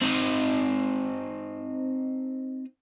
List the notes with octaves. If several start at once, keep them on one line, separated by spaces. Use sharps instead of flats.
C4 D#4